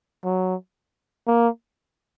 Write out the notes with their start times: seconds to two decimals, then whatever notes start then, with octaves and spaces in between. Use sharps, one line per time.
0.24 F#3
1.27 A#3